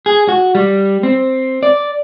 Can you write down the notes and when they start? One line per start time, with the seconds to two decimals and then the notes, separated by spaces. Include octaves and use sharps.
0.06 G#4
0.28 F#4
0.55 G3
1.03 C4
1.63 D5